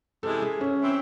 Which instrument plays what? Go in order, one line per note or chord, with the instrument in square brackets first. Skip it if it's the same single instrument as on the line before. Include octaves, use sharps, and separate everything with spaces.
[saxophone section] C3 E3 G#3 C#4 E4 [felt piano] A4
[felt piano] G#4
C#4
[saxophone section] E3 C4 E4